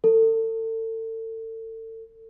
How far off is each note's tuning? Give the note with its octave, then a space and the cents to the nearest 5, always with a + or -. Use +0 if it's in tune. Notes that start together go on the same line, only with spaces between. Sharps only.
A4 +35